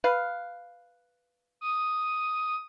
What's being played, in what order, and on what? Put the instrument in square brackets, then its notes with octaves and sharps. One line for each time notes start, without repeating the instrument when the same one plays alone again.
[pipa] B4 F5
[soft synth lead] D#6